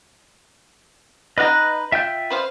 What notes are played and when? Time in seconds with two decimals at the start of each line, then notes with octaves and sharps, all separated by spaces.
1.38 D#4 F4 B4 D#5 F#6
1.92 F4 E5 G5 G6
2.30 B4 C5 F5